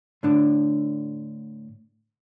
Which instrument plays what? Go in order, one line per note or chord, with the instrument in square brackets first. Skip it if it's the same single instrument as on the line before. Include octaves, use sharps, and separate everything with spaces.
[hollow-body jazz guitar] A2 D3 D4